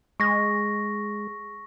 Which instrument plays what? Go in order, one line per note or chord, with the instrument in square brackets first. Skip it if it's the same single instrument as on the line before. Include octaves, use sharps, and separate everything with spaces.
[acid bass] G#3 [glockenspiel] C#6 A#6